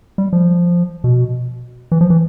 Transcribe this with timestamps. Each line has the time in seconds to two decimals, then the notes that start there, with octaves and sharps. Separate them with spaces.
0.18 G3
0.33 F3
1.04 B2
1.92 E3
2.01 F3
2.10 E3